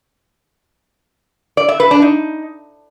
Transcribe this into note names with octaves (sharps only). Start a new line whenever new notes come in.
D5
E5
B4
D4
D#4